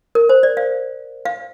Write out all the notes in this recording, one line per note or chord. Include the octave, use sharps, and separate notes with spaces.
A#4
C5
D5
F5
F5